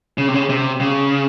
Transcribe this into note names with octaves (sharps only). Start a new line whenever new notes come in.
C#3
C3
C#3
C3
C#3